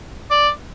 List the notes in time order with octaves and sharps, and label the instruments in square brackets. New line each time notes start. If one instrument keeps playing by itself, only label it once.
[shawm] D5